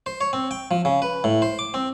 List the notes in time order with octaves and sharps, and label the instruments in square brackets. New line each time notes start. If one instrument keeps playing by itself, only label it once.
[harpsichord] C5
C#5
C4
G5
F3
C#3
B4
A2
C5
D6
C4